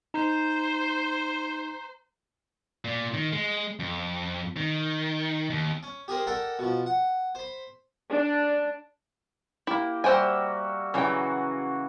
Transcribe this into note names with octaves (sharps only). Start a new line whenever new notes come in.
D#4 C5 A#5
A#2
D#3
G#3
F2
D#3
D#2
C#4
G4 G#4 A#4 C5
A4 A#4 D5 F#5 G5
B2 F3
F#5
C5 B5
D4
A#3 E4 G4
G3 F#4 C5 E5 G5 G#5
C#3 E3 F#3 F#4 G5